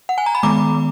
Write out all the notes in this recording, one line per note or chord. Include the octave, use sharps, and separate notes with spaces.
F#5
G#5
A#5
B5
D#3 G#3 B3 A#5 D6